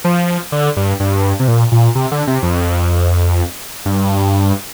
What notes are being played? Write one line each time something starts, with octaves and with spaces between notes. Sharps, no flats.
F3
D3
G2
G2
C3
A#2
A#2
C3
D3
C3
F2
G2